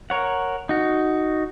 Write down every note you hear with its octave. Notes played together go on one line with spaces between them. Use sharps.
A#4 C#5 F#5
D#4 F#4